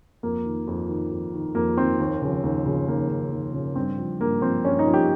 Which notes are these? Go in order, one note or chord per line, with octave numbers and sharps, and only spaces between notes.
F2 A#3
D#3
F2
D#3
F2
D#3
F2 A#3
D#3 C4
D#2
C#3 F3
D#2
C#3 F3
D#2 A#3
C#3 F3
D#2
C#3 F3
G2 C4
F3
G2 A#3
F3 C4
G2 C#4
D#4
F3
G4